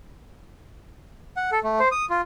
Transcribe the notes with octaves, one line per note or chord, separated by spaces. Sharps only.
F#5
A4
A3
C5
D#6
F4